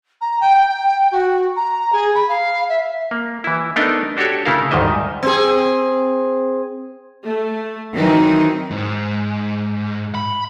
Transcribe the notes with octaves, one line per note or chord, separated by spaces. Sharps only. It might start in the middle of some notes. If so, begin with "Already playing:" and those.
A#5
G5
G5
F#4
A#5
G#4
B5
F5
E5
A#3
E3 E4
A3 B3 D4 D#4 A#4 D#5
D4 F#4 G4 A4 C#5
C#3 A3 E4 A4 A#4 F5
D2 G#2 D#3 G3 D#5 E5
C4 G#4
A3
D#3 E3 F#3 C4 D#4
G#2
B5